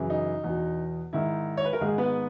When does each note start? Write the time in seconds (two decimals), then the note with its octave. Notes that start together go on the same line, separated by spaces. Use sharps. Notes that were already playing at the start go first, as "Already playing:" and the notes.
Already playing: F#2 C#3 E3
0.10 D#4
0.44 E2 B2
1.13 G#2 D#3 E4
1.57 C#5
1.65 B4
1.73 A#4
1.81 G#2 D#3 G#3 G#4
1.98 B3 B4